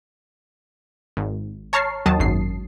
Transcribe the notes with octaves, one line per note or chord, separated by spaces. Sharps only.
G#1
C#5 A5 A#5 C#6 F6 C7
D#2 D#3 F#3 A5 D#6
G#1 F#2 C7